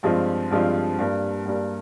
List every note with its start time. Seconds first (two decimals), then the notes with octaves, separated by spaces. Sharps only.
0.03 G2 F3 G#3 C4 F4
0.51 G2 F3 G#3 C4 F4
0.99 G2 G3 A#3
1.45 G2 G3 A#3